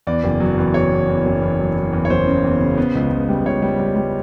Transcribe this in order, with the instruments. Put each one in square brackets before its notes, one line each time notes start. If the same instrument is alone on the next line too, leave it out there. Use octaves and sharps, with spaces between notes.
[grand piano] E2 D5
F#1
F#3
E2
E2 C#5
E2
E2
F#1
E2
F#3
F#3
E2
C#5
F#1 C5
C#3
E2
C#3
B3
C#2
C#2
G3
C#2 C#5
G3
G3
G3